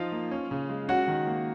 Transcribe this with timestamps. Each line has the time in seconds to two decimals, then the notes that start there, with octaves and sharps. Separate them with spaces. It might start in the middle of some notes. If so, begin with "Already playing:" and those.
Already playing: F3 D#4 F4 F5
0.12 A#3
0.31 C#4
0.51 C#3
0.69 G#3
0.88 C#4 F#4 F#5
1.08 D#3
1.27 A#3